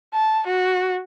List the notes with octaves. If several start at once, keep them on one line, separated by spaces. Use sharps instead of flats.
A5
F#4